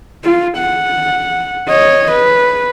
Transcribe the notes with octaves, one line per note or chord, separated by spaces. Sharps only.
F4
F#5
C#5 D#5
B4